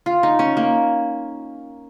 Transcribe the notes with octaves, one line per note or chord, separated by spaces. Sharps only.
F4
D#4
C#4
A#3